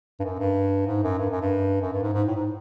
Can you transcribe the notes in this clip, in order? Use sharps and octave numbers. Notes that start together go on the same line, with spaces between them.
G2
F#2
G2
G#2
F#2
G2
F#2
G2
F#2
G2
G#2
G#2
A2
G#2